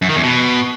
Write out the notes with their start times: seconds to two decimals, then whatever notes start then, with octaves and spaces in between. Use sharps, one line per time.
0.02 F#2
0.09 D#3
0.16 E2
0.23 B2